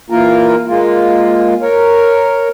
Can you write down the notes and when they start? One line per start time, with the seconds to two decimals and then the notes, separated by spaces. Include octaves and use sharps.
0.10 E3 A#3 F4 A#4
0.68 G#3 A#3 F4
1.62 A#4 C#5